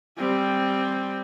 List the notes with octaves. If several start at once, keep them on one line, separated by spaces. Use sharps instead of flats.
G3 C4